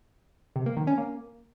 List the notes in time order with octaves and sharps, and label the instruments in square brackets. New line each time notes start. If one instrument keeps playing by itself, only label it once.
[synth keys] C3
A#3
D#3
C#4
A#3